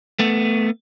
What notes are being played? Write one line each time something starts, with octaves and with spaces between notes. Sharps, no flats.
A3 B3